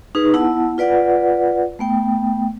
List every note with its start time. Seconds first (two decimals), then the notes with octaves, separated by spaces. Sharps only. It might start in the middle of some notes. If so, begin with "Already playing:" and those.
0.15 D#4 G#4 B4
0.34 B3 E4 F#5 A5
0.78 F4 B4 D5 F#5
1.79 A3 B3 G5